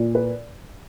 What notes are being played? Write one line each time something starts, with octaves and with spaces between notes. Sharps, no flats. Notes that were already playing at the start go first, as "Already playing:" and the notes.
Already playing: A#2
B4